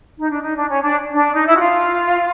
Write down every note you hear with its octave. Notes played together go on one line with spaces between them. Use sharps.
D#4
D4
D#4
D4
C#4
D4
D4
D#4
E4
F#4
F4